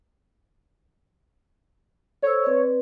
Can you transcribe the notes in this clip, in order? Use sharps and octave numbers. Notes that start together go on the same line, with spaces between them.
A4 C5 C#5 E6
C4 B4 D5